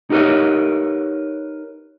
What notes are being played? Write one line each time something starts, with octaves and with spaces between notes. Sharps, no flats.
D#4 G4 A#4 B4 C#5